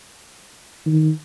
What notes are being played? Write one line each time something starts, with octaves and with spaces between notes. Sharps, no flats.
D#3